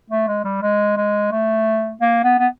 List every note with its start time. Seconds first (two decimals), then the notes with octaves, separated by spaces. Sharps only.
0.10 A3
0.28 G#3
0.44 G3
0.62 G#3
0.97 G#3
1.32 A3
2.01 A#3
2.24 B3
2.39 B3